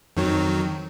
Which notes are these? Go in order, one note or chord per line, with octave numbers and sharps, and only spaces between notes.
F2 D#3 F#3